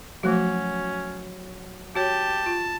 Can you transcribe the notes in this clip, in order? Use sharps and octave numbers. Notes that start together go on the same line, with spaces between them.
F3 F#3 A3 C#4 F#4
F#4 G4 C#5 A5
F4